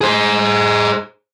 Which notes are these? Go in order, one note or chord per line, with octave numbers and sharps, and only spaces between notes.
G#4 C5